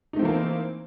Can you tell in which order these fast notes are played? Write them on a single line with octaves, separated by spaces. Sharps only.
D#4 A3 C4 E3 A#3